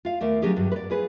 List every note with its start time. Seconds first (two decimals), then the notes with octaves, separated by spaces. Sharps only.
0.05 F4 F5
0.21 D#2 A3 A#4 D5
0.42 D3 F#3 A#3 C#4 G4 G#4
0.56 G2 D#3 F#3
0.72 B4 D5
0.90 F4 G#4 B4